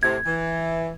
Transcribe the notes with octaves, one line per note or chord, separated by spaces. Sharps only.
A2 C3 G#6
E3